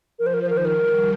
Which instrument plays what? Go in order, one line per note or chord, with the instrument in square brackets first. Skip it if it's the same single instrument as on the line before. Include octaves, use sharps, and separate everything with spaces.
[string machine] F3 [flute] A#4
[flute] C5
A#4
C5
[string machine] D#3 [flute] A#4
[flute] C5
A#4
[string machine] G3